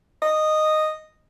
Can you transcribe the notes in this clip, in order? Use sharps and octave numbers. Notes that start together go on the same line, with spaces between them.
D#5